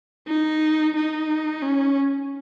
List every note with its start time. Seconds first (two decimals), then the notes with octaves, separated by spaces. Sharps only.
0.28 D#4
0.96 D#4
1.63 C#4